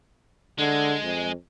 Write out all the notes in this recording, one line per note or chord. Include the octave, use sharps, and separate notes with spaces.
D3 G#3
F2